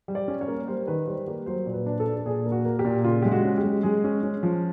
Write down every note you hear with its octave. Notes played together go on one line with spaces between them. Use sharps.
G3
D5
C#4
C#5
A#3
G3 C5
D#3 B4
G3 C5
A#3 G4
F#3 C5
A#2
B4
D4
A4
D4
A4
A#2 G#4
A#3
F#4
A#3
G4
A#2
C#3 F4
G#3 G4
F#4
C#4
G4
G#3
G#3 G#4
C#4
C#4
F3